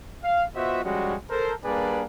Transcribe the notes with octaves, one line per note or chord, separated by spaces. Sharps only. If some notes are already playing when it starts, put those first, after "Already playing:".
F5
B3 F4 F#4 C5 D#5 E5
F3 G3 G#3 C#4 F#4
A4 A#4 C5
G3 A#3 D4 G#4 B4 D5